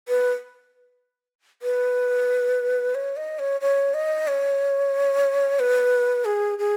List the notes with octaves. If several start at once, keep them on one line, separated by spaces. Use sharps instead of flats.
B4
B4
C#5
D#5
C#5
C#5
D#5
C#5
B4
G#4
G#4